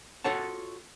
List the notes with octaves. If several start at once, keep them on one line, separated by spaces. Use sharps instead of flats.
F4 F#4 A4 C#5 F#5 A5